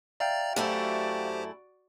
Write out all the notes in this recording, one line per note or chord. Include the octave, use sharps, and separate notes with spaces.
D5 E5 F5 G5 A#5 A6
F#2 A3 E4 F#4 G4 C5 D5